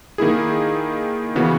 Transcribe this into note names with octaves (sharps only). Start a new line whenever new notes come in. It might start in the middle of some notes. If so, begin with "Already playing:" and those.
D#3 A#3 E4 G#4
C#3 E3 B3 F#4